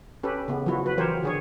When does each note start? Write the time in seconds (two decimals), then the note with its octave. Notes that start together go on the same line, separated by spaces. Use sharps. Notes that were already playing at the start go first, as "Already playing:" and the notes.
0.23 C#4 G4 A4 B4
0.48 C#3 B3
0.66 F3 F#3 B3 E4 F#4
0.86 B4
0.98 E3 F#3 G4 A#4 C5 C#5
1.23 D3 G#4 C#5